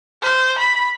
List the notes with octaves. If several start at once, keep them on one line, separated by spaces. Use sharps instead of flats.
C5
B5